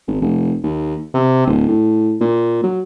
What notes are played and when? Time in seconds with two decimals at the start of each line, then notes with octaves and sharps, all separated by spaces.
0.07 G#1
0.21 F1
0.63 D#2
1.14 C3
1.47 D1
1.68 A2
2.21 A#2
2.63 F#3